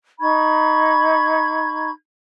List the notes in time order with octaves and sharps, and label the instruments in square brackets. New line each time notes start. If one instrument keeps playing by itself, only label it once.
[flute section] D#4 B5 C#6 G#6